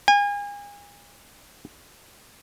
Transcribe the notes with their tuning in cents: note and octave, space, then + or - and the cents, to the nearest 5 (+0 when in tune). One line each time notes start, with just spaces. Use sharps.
G#5 -35